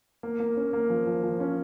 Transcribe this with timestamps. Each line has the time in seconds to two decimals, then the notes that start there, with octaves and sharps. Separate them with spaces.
0.23 A#3
0.40 A#3
0.57 C#4
0.73 A#3
0.90 F3
1.07 F3
1.23 F3
1.40 C#4